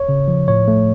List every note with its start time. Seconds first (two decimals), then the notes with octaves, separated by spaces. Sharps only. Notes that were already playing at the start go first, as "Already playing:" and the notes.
Already playing: C#5
0.09 C#3
0.28 F3
0.48 A2 C#5
0.68 A3